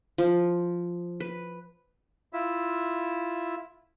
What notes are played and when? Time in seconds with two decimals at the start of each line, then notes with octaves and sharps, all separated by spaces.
0.18 F3
1.20 B4
2.33 E4 F4 E5